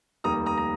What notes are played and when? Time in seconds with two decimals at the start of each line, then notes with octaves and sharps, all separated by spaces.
0.24 F1 D#2 D#3 G3 A#3 A#5 D#6
0.46 A#5 D#6
0.57 A#5